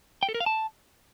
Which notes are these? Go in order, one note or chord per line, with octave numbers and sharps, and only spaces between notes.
G5
A4
A#4
F5
A5